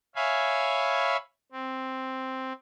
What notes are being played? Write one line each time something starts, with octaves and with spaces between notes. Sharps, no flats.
C#5 E5 F5 G#5 B5
C4